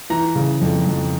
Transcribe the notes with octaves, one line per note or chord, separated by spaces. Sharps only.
E3 A#5
C#3
F2
F2